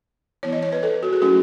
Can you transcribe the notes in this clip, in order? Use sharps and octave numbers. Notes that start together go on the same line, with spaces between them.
E3 B3 E4 C#5
D#5
C#5
B4
A4
F#4
G#4
F#3 A3 C#4 E4 F#4